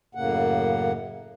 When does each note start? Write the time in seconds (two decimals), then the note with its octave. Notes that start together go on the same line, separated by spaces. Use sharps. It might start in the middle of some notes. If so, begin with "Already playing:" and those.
0.15 F#2 A2 C#3 A#3 F#5